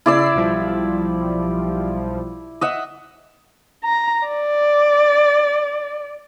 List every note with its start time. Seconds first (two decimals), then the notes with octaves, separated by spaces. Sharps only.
0.06 C#3 E4 D5 E6 C7
0.35 B1 F3 G3
2.61 D#5 E5 F#5
3.84 A#5
4.28 D5